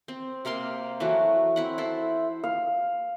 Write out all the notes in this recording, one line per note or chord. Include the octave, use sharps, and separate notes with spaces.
C4
C3 A#3 F5 C6
E3 F#3 A3 F#4
C4 E4 F#5
E4 A4 C5
F5